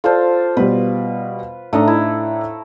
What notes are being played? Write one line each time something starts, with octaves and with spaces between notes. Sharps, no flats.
F4 A4 C5 D5 A5
B2 G3 B4
A2 A3 D4 D#4 D#5 A#5
E4